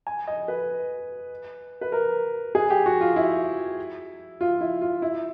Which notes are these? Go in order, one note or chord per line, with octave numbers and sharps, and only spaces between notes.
G#5
D#5
B4
B4
A#4
G#4
G4
F#4
F4
E4
F4
E4
F4
E4